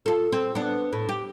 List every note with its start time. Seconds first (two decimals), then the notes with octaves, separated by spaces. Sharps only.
0.06 F4 A4
0.32 C4
0.55 B3 D4
0.93 A2
1.09 G4